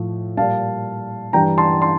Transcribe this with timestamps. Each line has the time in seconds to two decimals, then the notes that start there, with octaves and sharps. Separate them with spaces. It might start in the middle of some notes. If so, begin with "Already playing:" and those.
Already playing: A2 F3
0.37 A#2 G3 F5 A5
1.33 G2 E3 G3 G5 A#5
1.58 A5 C6
1.82 A5 C6